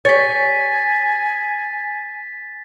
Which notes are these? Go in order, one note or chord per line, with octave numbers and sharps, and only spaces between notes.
G4 C#5 G#5 A6 B6